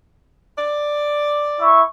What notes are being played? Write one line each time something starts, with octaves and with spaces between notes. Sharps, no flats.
D5
E4 E5 C#6